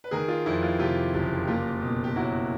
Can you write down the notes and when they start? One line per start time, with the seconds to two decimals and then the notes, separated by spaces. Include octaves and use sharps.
0.04 B4
0.11 D#3 G#4 A#4
0.28 F4
0.46 F2 E4
0.63 F4
0.79 C3 F4 G4
1.14 F#1 F4 G4
1.47 A#3 F4 G4
1.82 B2
2.04 G4
2.15 F#3 E4 F#4